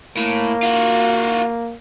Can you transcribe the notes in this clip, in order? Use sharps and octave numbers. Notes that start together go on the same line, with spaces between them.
A2 A#3
F4 F#4